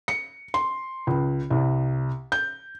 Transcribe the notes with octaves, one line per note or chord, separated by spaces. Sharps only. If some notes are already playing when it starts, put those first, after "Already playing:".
C#7
C6
C#2
C2
G6